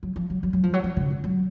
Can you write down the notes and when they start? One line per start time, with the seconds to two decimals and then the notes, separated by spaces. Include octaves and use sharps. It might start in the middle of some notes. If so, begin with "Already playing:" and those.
0.03 F#3
0.16 F3
0.30 F#3
0.43 F#3
0.53 F#3
0.63 F3
0.74 F#3
0.84 F3
0.97 C#3
1.10 D3
1.24 F#3